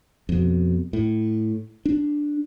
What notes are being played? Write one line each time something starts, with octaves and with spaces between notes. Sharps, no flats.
F2 B2
A2
D4